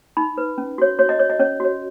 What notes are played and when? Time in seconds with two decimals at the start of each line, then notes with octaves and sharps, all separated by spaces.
0.17 D#4 B5
0.38 B4
0.58 C#4
0.78 F#4 C#5
0.99 F#4 C#5
1.09 D#5
1.19 C#5
1.30 D#5
1.39 C#4 C#5
1.60 F#4 C#5